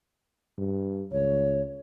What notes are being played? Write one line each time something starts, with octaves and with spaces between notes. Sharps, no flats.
G2
C#2 C#5